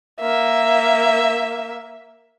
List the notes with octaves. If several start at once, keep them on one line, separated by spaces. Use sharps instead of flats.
A#3 E5